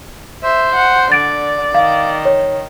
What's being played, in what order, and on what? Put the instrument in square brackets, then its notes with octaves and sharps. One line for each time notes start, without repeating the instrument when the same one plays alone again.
[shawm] C5 [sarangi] E5
[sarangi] F#5
[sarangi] D3 [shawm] D5 [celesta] A6 D7
[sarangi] D#3 [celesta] F5
[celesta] C#5